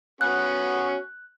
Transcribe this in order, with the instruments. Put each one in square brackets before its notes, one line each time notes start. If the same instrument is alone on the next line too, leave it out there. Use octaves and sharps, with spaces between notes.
[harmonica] B3 C#4 F#4 [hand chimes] F#6